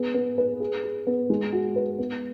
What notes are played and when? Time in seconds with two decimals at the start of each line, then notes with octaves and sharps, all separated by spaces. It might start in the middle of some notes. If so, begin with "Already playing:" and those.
Already playing: B3 G#4
0.14 B3
0.38 B4
0.60 G#4
0.84 G#4
1.07 B3
1.30 G#3
1.53 F#4
1.76 B4
1.98 B3